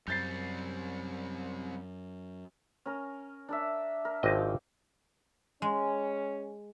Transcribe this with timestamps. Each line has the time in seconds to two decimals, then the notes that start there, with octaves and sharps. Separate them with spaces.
0.08 F#2 G3 C4 G6 A6 C7
2.86 C#4 A#4
3.49 D4 A#4 E5
4.05 A#4
4.23 G#1 F3 D#5 G5 D6
5.62 G#3 C#4